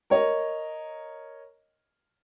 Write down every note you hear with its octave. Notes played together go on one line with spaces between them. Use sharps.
A#4 C#5 D#5